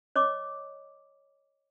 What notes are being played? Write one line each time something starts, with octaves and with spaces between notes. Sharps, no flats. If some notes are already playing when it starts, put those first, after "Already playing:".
C#5 D#5 D6